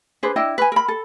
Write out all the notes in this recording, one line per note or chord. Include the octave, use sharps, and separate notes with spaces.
D4 G#4 B4 C5
D4 E4 D#5 G5
B4 G#5
A#4 B5
A4